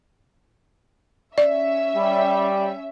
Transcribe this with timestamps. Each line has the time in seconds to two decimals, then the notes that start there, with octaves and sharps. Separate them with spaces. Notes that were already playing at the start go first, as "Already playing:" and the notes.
1.38 C#4 D5 E5
1.96 G3